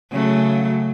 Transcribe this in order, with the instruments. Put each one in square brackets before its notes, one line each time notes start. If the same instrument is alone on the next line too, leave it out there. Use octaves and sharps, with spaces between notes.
[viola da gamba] C#3 F#3 A3